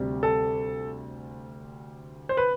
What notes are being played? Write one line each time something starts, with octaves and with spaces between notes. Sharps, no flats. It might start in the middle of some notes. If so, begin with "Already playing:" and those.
Already playing: D2 C3 G3
A4
C5
B4